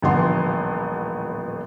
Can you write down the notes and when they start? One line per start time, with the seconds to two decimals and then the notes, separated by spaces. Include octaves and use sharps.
0.02 D#1 A1 D3 F3 B3 C6